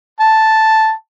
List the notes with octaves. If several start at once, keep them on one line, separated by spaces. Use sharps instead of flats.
A5